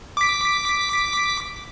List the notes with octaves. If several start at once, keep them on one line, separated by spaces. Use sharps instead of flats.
D6 B6